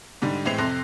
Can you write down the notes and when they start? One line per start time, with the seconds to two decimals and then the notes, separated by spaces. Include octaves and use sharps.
0.22 G#2 D3 G3
0.46 A2 E3 G#3 C4 C7 F7
0.58 F2 C3 A4 C6 F#6 A#6